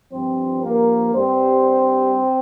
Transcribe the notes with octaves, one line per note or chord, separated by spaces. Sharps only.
G2 F3 C4 C5
A#3 A#4
G2 G3 C4 C5